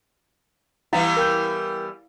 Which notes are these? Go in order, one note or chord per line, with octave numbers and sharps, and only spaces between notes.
E3 G3 B3 E4 F5
A#4 G5 G6